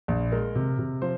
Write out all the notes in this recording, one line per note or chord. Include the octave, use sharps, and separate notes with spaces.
A#1
G#3 A#4
C3
C3
F3 C5